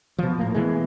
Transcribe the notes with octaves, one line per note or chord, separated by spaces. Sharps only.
B2 F3
A2 A#3
B2 E3 G#3